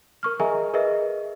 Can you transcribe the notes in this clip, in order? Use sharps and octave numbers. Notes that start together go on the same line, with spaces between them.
A#4 C#6 F6
G#4 A#4 D#5 E5 G#5 A#5
G#4 A#4 B4 D#5 E5